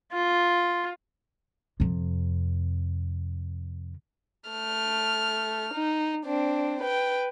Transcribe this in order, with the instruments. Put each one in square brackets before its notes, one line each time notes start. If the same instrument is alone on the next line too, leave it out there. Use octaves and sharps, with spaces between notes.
[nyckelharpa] F4
[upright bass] F2 C3
[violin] A3 F6
D#4
C4 D4
B4 G5